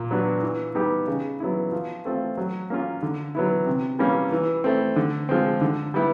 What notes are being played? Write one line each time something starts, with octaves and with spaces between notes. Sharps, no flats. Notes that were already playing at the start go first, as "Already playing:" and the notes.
Already playing: A#2
F#3 B3 D4 F#4
E3
G3 B3 D#4 G4
C#3
F#3 B3 E4
F3
A3 C4 F4
F#3
A#3 C#4 F4
D3
F#3 B3 E4
C3
E3 G3 A#3 C#4
E3
A3 C4
D3
F3 G#3 C4
D3
G3 B3 E4